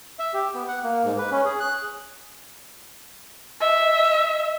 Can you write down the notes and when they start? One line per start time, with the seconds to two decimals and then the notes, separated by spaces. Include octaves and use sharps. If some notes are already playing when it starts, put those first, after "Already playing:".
0.19 E5
0.34 G4
0.54 B3
0.68 F#5
0.83 A#3
1.04 G#2
1.18 B4
1.31 C#4
1.45 G#4
1.60 F#6
3.61 D#5 E5